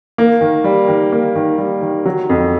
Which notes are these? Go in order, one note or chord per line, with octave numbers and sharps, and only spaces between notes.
A#3
D#3
G3
D#3
A#3
D#3
G3
D#3
F#3
F2